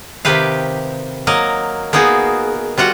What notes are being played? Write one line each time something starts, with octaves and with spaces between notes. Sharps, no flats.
C3 D#3 G4 B4 F5
F#3 A#3 A#4 D#5
A#3 B3 D#4 F#4 G#4
G3 F4 F#4 F#5